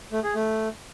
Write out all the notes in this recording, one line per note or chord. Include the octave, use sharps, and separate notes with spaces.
A3
G#4
A3